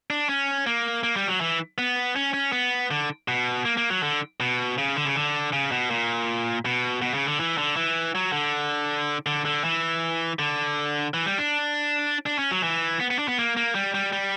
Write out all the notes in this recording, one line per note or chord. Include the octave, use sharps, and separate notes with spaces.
D4
C#4
A#3
A#3
G3
F#3
E3
B3
C#4
C#4
B3
D3
B2
A#3
A#3
F#3
D3
B2
C#3
D3
C#3
D3
C#3
B2
A#2
B2
B2
C#3
D3
E3
D3
E3
F#3
D3
D3
D3
E3
D3
E3
G3
D4
D4
C#4
F#3
E3
B3
B3
D4
B3
A#3
A#3
G3
G3
G3